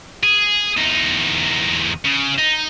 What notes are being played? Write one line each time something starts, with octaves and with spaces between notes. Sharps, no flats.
G#4
E2 D#4
C#3
D#4